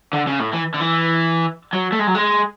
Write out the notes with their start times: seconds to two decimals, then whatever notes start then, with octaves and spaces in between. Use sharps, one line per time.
0.13 D3
0.27 C#3
0.40 A2
0.53 E3
0.74 D3
0.80 E3
1.73 F#3
1.92 A3
1.99 G#3
2.07 F#3
2.15 G#3